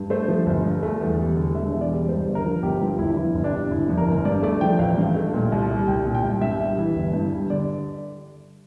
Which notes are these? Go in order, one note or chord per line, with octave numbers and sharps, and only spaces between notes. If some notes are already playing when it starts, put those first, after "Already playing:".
Already playing: G2
A3 C5
F3
G1
G2
A3
E2
G3
D3
E1 E5
E2
D5
G3
G2 C5
G1
A#4
F3
G1 G4
G2 F4
G1 E4
F2 E4
G1
D4
C3
G1 E4
F2
A#4
G1
G2 D5
A3 D5
F3 G5
A1 F5
G2
A3
A#2
C2
G3
C2 G5
A#2
G5
C2
G2 E5
G3
E3
G1
G2
G3
D3 D5